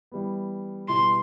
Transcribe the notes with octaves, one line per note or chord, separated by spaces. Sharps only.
E3 G3 B3
B2 G3 B3 E4 C6